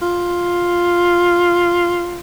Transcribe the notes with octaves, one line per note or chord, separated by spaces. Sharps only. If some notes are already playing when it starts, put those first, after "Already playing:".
F4